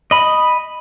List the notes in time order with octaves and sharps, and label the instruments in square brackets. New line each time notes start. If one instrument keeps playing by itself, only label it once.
[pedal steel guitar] D#5 B5